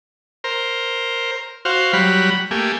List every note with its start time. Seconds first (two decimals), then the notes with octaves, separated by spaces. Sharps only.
0.44 A#4 C5
1.65 F#4 C5 F5
1.93 F#3 G3 F#5 B5
2.51 A3 A#3 G4 G#5